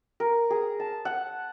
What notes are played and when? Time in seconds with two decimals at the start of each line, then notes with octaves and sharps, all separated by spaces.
0.20 A#4
0.50 G#4
0.80 A5
1.05 F#5